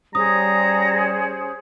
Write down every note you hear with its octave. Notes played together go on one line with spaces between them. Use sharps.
G3 C#4 G#4 C5 A#5 D#6